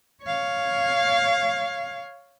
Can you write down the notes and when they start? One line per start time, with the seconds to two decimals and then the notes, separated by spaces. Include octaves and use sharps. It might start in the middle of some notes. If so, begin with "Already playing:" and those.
0.23 C#5 F5